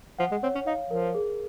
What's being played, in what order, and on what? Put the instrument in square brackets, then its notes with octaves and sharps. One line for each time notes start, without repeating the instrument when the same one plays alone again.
[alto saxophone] F3 [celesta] F#5
[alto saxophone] G#3
[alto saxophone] C4 [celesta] C#5
[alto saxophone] C#4
[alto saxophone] D#4 [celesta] F5
[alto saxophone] F3 [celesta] A#4
[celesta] G#4